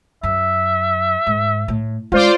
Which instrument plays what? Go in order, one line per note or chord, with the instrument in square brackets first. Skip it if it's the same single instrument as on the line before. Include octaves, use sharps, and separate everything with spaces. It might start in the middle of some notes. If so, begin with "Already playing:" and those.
[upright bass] F#2 [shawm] E5
[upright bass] G#2
A2
[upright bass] G#3 C#4 [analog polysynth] F4 C5 D5